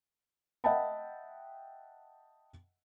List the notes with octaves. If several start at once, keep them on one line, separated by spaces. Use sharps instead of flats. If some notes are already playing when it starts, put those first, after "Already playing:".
D#5 E5 F#5 G5 A5 B5